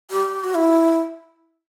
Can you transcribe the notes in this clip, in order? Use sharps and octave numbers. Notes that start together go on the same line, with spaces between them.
G4
F#4
E4